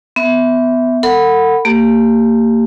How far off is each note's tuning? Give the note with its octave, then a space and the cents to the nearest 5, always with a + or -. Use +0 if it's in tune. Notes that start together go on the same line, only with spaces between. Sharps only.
B3 +15 E5 -5
A4 +45 F#5 +0 B5 +0
A#3 -30 G4 +0